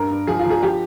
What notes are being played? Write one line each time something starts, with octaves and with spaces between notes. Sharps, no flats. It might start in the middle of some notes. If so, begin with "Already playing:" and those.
Already playing: G2 A#4
G2
F3 G#4
F4
F3 G#4
F3 G4